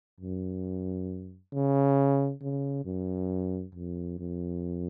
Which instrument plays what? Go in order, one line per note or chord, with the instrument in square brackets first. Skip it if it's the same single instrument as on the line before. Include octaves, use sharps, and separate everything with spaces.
[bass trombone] F#2
C#3
C#3
F#2
F2
F2